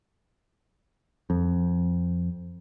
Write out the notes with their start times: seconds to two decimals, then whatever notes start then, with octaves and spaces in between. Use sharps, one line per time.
1.30 F2